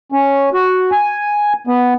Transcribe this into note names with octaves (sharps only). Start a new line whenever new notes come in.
C#4
F#4
G#5
B3